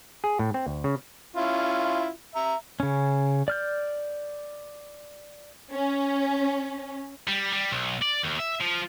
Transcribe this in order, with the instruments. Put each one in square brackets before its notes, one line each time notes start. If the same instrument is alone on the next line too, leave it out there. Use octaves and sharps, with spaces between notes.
[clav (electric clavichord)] G#4
A2
C4
D2
C#3
[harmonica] C#4 E4 F4
E5 A#5
[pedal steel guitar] C#3 C#4
D5 F6 G6
[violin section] C#4
[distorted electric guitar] G3
G3
B1
D5
D#2
E5
F3